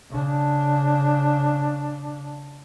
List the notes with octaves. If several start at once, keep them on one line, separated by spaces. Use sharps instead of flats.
C#3 D4